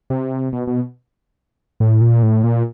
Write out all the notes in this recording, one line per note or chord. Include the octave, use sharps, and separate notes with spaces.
C3
B2
B2
A2
A#2
A2
A#2